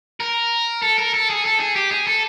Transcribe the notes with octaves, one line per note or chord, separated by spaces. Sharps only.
A#4
A4
A#4
A4
G#4
A4
G#4
G4
G#4
A4